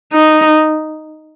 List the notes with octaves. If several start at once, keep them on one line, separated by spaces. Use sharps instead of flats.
D#4